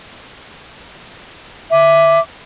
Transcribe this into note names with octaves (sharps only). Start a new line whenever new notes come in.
E5 D6